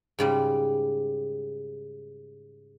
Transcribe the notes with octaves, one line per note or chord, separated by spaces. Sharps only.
G#2 C#3 G3